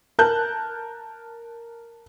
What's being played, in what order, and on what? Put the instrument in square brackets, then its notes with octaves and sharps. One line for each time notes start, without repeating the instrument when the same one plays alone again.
[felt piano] A#4 A5 F#6 G6